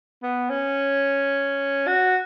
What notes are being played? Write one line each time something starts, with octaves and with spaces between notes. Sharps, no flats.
B3
C#4
F#4